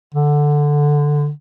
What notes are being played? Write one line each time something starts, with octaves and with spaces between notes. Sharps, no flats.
D3